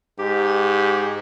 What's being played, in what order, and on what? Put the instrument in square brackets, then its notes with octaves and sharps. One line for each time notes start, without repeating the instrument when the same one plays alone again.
[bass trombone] G#2 [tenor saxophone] G4